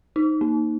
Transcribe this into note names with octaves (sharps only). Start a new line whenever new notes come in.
D#4
A#3